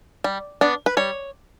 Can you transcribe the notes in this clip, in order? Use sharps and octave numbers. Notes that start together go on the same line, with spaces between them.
G3
B3 D4
B4
G3 C#5